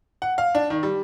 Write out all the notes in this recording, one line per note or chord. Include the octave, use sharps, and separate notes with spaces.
F#5
F5
D4
D#3
G3